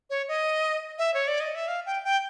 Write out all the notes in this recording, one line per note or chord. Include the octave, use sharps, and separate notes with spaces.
C#5
D#5
E5
C#5
D5
D#5
E5
F5
G5
G5